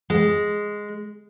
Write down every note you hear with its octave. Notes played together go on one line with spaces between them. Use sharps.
G#3